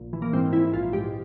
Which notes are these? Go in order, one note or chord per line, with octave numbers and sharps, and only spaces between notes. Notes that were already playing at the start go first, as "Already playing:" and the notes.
Already playing: A#1
E3
A#3
G#2 C4
E3 E4
A#1 F4
G#2 G4